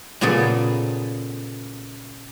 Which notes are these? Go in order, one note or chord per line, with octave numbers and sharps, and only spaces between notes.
A#2 C#3 B3 G#4 A4